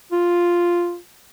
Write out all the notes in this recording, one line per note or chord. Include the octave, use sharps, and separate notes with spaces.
F4